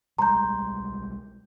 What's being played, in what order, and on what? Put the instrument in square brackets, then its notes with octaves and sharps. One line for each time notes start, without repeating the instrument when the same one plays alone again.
[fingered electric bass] B1 G3 G#3 [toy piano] A#5 [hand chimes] C6 G6